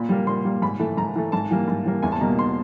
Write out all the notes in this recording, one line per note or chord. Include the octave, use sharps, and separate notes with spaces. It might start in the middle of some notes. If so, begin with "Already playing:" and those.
Already playing: A#2 B5
G3 A#3
A#2 C6
G3 A#3
G#2 B5
E3 A3
G#2 A#5
E3 A3
G#2 A5
E3 G3 A#3
G#2
E3 G3 A#3
E2 G#5
A5
B2 G3 A#3 A#5
C6